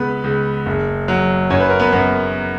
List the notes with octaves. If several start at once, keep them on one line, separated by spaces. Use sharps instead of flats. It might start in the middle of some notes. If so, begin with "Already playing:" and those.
Already playing: C#2 B3 B4
C#2
F#1
F#3
F#2 C#5
B4
A#4
B3 B4
F#2 B3 B4